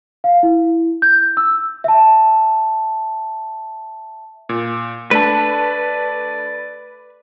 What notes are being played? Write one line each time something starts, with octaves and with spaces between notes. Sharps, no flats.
F5
E4
G6
E6
E5 A5
A#2
A3 D4 B4 D5 A5